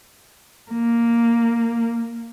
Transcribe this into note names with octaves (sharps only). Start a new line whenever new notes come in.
A#3